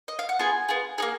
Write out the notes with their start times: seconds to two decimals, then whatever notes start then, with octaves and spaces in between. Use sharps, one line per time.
0.08 D#5
0.19 F5
0.29 F#5
0.39 B3 F4 G#4 G#5
0.69 B3 F4 G#4
0.98 A#3 D#4 G#4